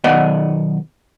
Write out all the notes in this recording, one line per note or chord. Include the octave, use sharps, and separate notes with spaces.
B1 D#3 B3 D5 D#5 F#5